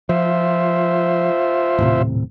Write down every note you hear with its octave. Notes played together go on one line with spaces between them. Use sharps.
F3 F4 C5 E5
D#1 A2 C3